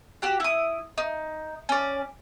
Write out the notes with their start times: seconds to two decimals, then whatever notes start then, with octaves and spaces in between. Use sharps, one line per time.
0.22 F#4 G4 F#5
0.40 E4 D#6
0.98 D#4
1.69 C#4 D5